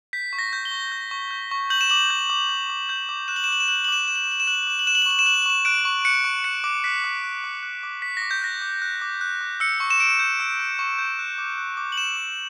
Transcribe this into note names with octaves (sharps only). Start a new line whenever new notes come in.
G6 B6
C#6
A#6
G6
G7
C#6
G6
C#6
G6
C#6
G6 F#7
E7
D6 F#7
G6
D6
G6
D6
G6
D6
F#6 E7
F#7
E7
D6 F#7
E7
F#6 F#7
E7
F#7
D6 E7
F#7
F#6 E7
F#7
E7
D6 F#7
E7
F#6 F#7
E7
F#7
D6 E7
F#7
F#6 E7
F#7
E7
C#6 F#7
E7
F#6 F#7
E7
F#7
C#6 E7
F#6 D7
C#6
F#6 C#7
C#6
F#6 C#7
D6
F#6 B6
D6
F#6
D6
F#6
D6
F#6 B6
A#6
D6
G6
F#6 A#6
D6
F#6
D6
F#6
D6
E6 C#7
C#6
E7
C#6 D7
G6
E6
C#6
C#6
G6
F#6
D6
F#6
D6
F#7
F#6 E7
D6